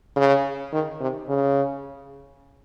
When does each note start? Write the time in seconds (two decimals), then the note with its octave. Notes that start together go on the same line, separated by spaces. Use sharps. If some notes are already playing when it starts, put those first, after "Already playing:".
0.16 C#3
0.73 D#3
1.01 C3
1.29 C#3